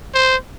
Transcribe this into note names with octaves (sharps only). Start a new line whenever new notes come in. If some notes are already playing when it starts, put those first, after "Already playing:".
C5